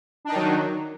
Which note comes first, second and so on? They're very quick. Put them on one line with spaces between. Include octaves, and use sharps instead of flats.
D4 D#4 D#3 F#3